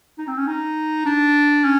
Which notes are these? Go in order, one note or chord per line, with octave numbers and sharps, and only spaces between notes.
D#4
C4
C#4
D#4
D4
C#4